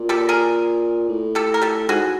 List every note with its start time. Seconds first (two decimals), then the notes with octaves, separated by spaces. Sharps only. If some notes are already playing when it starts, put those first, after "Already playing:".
Already playing: A#2
0.09 G4 A4
0.29 G#4 A#4
1.09 A2
1.35 G4 A4
1.54 A#4
1.62 G4 A4
1.89 G#2 F#4 G#4